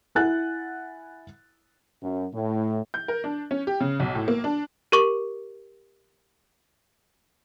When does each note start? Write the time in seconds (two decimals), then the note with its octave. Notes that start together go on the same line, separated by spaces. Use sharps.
0.15 E4 F#5 G#5 F#6 A6
2.02 F#2
2.33 A2
2.94 G6
3.08 A#4
3.24 D4
3.51 C#4
3.67 G4
3.80 C#3
4.00 B1
4.15 A2
4.28 A#3
4.44 D4
4.92 G4 A#4 C#6 D6